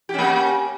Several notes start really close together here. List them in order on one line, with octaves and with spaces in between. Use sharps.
G4 C#4 A#3